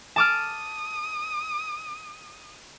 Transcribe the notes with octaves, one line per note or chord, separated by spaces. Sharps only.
A5 D6 D#6 F6